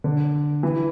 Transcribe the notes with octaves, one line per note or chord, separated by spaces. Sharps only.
D3
E3